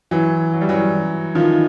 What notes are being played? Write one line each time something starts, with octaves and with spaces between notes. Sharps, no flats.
E3 F#3
F#3
G3
E3 F#3
D#3 F3